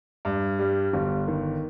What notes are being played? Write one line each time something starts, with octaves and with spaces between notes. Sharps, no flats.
G2
G3
G1
D#3